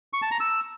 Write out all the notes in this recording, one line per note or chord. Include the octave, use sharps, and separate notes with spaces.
C#6
A5
A#5
E6